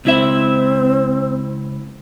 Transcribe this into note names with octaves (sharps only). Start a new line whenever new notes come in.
C#2 C4 E4 E5